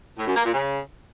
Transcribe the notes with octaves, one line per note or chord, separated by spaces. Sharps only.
A2
F#2
A#3
A#2
C#3